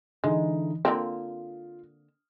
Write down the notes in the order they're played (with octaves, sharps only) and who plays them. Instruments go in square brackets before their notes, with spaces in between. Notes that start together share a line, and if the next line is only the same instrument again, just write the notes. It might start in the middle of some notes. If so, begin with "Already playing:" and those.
[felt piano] D3 E3 D#4 [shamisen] G#3
[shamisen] D3 A#3 C4 [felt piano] F4